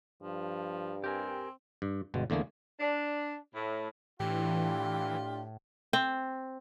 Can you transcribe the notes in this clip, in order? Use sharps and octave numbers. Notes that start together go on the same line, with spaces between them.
G2 F3
C4 G4 A#4 G#5
G2
G1 B2 G#3
E2 D3 A3 A#3 G#4
D4
A2
A2 E3 D4 F4 G4
C4